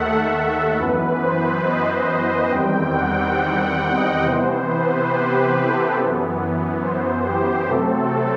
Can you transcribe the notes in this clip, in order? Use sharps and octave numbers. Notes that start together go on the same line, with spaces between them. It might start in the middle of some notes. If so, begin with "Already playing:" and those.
Already playing: D#2 D#3 A3 A4 E5 F#5
A4
F#2 E3 B3 B4
C5
D#5
C5
E2 D#3 G3 C4 G5
F#5
G5
F#5
D#5
C3 E3 B3 C5
B4
G4
G4
A4
F#2 E3 B3
C5
G4
C3 F#3 A3 C4 A4